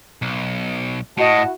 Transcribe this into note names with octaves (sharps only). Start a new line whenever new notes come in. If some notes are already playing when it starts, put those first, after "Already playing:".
B1
A2 E4 F#4 D#5 A5